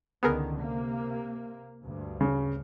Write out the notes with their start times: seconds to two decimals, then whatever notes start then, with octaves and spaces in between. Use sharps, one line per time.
0.23 C#2 D3 D#3 B3 G#4 A#4
0.59 C3 A#3
1.84 D2 G2
2.21 C#3